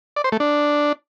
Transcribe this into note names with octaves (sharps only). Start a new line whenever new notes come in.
D5
C5
A3
D4